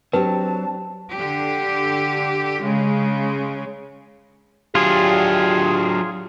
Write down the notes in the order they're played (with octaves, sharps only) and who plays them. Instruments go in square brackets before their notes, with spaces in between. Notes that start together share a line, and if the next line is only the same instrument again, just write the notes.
[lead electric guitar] F#3 [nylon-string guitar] C4 D4 G4 [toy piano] B4 [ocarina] A5
[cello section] D3 G4
C#3 G#3
[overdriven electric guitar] F#3 D4 [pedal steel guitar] F4 G#4 [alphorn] G4